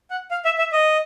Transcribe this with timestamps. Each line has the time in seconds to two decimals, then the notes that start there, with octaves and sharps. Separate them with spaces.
0.10 F#5
0.31 F5
0.45 E5
0.58 E5
0.72 D#5